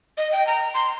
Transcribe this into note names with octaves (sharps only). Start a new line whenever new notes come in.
D#5
G5
A#5
C6